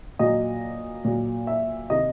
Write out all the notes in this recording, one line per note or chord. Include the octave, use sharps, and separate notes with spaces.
A#2 F#3 D#5
A#2 F#3
E5
C3 D#3 G3 D#5